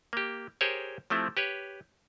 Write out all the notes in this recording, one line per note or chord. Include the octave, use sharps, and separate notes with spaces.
A#3 G4
G4 G#4 A#4 C5 C#5
F3 A3 C4 E4 G4
G4 B4 C#5